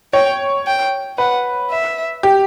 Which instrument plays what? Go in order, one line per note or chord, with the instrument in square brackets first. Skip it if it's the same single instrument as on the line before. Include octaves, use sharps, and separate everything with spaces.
[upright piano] C#5 [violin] G5
[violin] G5
[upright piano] B4 [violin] F#5
[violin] E5
[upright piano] G4